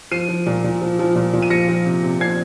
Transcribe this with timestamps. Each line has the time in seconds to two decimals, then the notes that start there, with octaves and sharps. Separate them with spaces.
0.11 F3 C7 D#7
0.29 F3
0.46 A#2
0.64 A#2
0.82 F3
0.99 F3
1.16 A#2
1.33 A#2
1.42 D#7
1.50 F3 A#6 C#7
1.69 F3
1.86 C3
2.03 C3
2.20 F3 G#6 C7